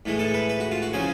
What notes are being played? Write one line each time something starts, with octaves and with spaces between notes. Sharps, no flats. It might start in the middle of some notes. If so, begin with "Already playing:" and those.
A2 E3 G#3
A4
B4
B4
F#4
F4
F#4
C#3 F3 G#4